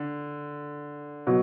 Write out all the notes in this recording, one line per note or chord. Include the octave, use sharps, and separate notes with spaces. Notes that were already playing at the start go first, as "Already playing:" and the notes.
Already playing: D3
B2 F#3